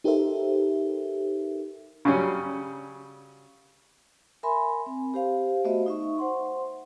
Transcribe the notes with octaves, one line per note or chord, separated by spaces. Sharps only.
D#4 G4 A4 A#4 C5 E5
C#3 F#3 G3 C#4
A#4 E5 G#5 B5 C6
C4
G4 C5 F5
A3 B3 F#4 C5 D#5 E5
D#4 E5 C#6
C5 F#5 C6